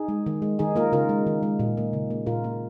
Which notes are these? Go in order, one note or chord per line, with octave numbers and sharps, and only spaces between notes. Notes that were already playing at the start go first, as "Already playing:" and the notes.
Already playing: D#4 G#4
G#3
D#3
G#3
D#3 D#4 G#4
A#3 F4 A#4
C#3 F4 A#4
G#3
D#3
G#3
A#2
A#3
C#3
A#3
A#2 F4 A#4
A#3